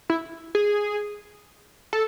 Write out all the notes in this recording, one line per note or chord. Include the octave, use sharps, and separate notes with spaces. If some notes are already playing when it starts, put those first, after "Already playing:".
E4
G#4
A4